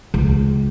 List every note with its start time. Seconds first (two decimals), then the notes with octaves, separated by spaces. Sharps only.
0.14 C#2